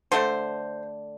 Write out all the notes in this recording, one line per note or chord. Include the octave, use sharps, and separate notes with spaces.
D3 A3 C5